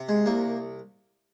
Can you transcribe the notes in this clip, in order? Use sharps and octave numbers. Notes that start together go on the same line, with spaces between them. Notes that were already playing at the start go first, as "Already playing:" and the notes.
Already playing: C3
G#3
C2 A#3